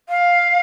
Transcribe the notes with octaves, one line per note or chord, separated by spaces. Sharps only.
F5